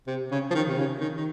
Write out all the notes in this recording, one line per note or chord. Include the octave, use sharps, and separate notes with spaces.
C3
C#3
F3
D#3
C3
C#3
D#3
D#3